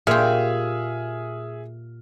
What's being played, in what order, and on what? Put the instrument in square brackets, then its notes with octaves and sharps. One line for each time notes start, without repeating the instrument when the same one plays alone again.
[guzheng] A#2 G4 [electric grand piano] G#4 E5 F6